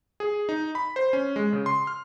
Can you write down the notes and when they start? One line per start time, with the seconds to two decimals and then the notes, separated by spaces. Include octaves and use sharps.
0.20 G#4
0.49 D#4
0.75 B5
0.96 C5
1.13 C#4
1.36 G#3
1.53 C#3
1.66 C6
1.87 F6